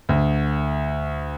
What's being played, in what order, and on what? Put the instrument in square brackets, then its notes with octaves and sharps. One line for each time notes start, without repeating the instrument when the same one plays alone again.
[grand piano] D2